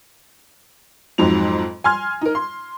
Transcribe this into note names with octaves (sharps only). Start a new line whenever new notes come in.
F2 G#2 F#3 F7
G#5 C6 F6 G#6
D#4 A#4
C6